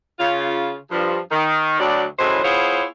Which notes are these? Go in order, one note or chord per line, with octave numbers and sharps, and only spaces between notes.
C#3 F4
G2 F3
D#3
D2 F#3 D5
A2 E3 F#3 G#3 C#4 C5
B3 E4 F4 G#4 C5 C#5